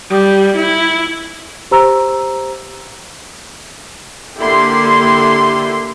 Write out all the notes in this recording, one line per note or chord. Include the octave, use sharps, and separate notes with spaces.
G3
E4
G4 C5 A#5 E6
D3 A#3 E4 G4 C6